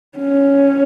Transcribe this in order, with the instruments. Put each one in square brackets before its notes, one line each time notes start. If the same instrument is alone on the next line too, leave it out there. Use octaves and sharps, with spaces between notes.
[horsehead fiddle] C#4